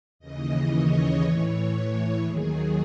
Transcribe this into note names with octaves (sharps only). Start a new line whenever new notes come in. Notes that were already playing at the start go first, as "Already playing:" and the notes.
D#2 C#3 E3 D#5
C#5
A2 E3
D#2 D#3 F#3 G#4